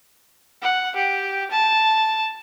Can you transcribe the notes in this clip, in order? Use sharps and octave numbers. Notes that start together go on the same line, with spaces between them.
F#5
G4
A5